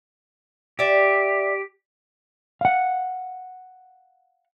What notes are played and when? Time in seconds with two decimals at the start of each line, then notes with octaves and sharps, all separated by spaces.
0.79 G4 D5 E5
2.61 F5 F#5